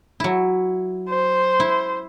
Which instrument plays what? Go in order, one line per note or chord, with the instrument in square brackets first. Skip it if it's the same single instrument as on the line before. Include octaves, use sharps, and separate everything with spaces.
[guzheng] F#3 E4
[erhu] C5
[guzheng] E4